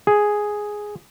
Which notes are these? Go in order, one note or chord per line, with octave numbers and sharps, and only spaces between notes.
G#4